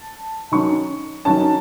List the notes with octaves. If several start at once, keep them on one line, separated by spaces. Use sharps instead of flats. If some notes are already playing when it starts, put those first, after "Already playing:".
Already playing: A5
D#3 F#3 C#4 C#6
D#3 F#3 C#4 A5